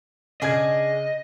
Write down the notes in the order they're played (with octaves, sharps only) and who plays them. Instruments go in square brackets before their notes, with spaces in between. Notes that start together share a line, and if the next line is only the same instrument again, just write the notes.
[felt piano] C#3 G#6 [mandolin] D4 G#4 [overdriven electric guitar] D#5